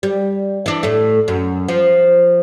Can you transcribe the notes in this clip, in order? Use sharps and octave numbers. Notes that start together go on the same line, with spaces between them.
G3
E3 D4
A2 A3
F#2
F3